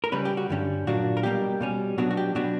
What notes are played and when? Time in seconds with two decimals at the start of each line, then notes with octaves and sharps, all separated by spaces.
0.04 A#4
0.12 C#3 G3 C#4 B4
0.25 G4
0.37 F#4
0.50 G2 D3 G3 C#4
0.87 A#2 F#3 A#3 D4 F#4
1.17 A#4
1.23 B2 G3 A#3 G4
1.61 B2 G3 C#4
1.98 B2 F#3 B3 D4 F#4
2.11 F#4
2.17 G4
2.35 B2 F#3 B3 D4 F#4